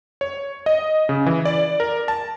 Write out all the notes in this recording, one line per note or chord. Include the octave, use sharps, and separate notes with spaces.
C#5
D#5
C#3
E3
D5
A#4
A5